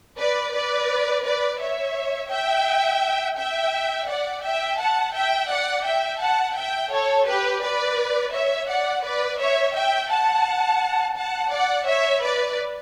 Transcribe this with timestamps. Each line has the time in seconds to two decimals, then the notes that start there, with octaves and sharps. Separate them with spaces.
0.18 B4 D5
0.54 B4 D5
1.25 B4 D5
1.60 C#5 E5
2.31 E5 G5
3.37 E5 G5
4.08 D5 F#5
4.44 E5 G5
4.79 F#5 A5
5.15 E5 G5
5.50 D5 F#5
5.86 E5 G5
6.21 F#5 A5
6.56 E5 G5
6.92 A4 C#5
7.27 G4 B4
7.63 B4 D5
8.34 C#5 E5
8.69 D5 F#5
9.04 B4 D5
9.39 C#5 E5
9.75 E5 G5
10.10 F#5 A5
11.16 F#5 A5
11.52 D5 F#5
11.87 C#5 E5
12.23 B4 D5